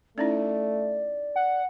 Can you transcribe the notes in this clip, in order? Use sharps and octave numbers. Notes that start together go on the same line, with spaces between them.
A3 C#4 D#4 E4 D5
F#5